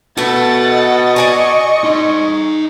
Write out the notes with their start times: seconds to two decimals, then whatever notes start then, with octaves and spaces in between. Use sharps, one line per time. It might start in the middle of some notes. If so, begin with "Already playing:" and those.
0.17 A3 B3 F#4 B4 F#5 A6
0.68 D#5
1.16 D5 G#5 A#5 C#6
1.84 D#4 C6